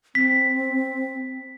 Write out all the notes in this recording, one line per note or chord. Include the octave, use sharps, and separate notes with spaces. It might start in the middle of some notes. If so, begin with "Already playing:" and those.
C4 B6